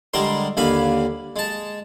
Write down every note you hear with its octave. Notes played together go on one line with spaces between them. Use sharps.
D3 G3 G#3 A#4 C6
D#2 D3 F5 G#5 B5
G#3 A5